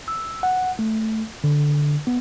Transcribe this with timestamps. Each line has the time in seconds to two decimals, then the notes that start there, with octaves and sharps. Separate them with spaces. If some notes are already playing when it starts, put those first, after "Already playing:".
0.08 E6
0.43 F#5
0.79 A3
1.44 D3
2.07 B3